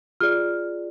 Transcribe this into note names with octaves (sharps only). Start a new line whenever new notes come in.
F4 G#4 D5 F6